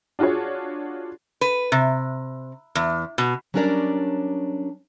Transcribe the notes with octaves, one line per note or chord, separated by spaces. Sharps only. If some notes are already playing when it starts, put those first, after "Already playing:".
D4 F4 F#4 G#4 C#5
B4
C3
E2
B2
F#3 G3 C#4 D4 A#4 D5